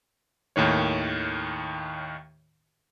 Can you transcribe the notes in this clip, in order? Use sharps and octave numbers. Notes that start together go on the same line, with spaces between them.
D#2 A2 D#3 C#5